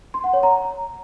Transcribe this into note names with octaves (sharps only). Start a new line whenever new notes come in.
C6
F#5
C#5
A#5